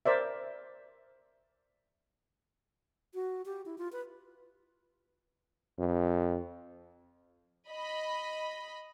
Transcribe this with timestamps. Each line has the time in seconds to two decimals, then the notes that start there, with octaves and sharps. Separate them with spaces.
0.06 A#4 C5 D5 E5
3.14 F#4
3.46 G4
3.66 E4
3.78 F4
3.92 B4
5.78 F2
7.70 D#5 B5